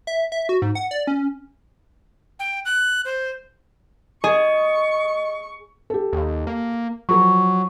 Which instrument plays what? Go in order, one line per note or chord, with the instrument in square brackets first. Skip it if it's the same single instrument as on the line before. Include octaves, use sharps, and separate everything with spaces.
[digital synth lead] E5
E5
F#4
G#2
F#5
D5
C#4
[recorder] G5
F#6
C5
[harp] G#4 [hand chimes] D#5 [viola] C#6
[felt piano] G4 A4
[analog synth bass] D#2
A#3
[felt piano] F3 A#4 [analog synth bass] F#3 [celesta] C#6